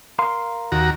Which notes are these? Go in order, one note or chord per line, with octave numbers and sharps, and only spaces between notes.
A#4 F5 C6
D#2 F#4 A#5